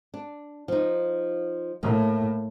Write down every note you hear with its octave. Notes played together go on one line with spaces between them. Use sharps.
D4
F3 D#4
A2 A#3